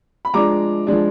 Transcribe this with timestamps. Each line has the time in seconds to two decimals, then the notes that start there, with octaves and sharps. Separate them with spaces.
0.25 B5
0.34 F3 G#3 D4 A#5 D6
0.87 F3 G#3 D4